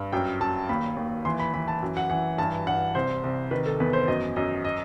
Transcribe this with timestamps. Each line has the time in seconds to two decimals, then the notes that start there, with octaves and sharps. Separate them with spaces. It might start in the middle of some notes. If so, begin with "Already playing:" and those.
Already playing: G2
0.12 F#2 G5
0.40 F#2 A5
0.69 D#2 B5
0.97 D#2
1.25 E3 C6
1.40 B5
1.54 E3 B5
1.68 A5
1.82 F#2
1.97 F#5
2.10 E3 F#5
2.38 G2 A5
2.67 G2 F#5
2.95 C2 C5
3.24 C2
3.51 D#3 B4
3.66 A4
3.80 E2 B4
3.93 C5
4.07 F#2 D#5
4.36 F#2 D#5
4.65 D#5